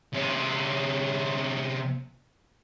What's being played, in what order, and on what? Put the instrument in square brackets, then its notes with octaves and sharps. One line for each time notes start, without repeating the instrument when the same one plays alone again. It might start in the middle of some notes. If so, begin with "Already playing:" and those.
[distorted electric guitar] C3 C#4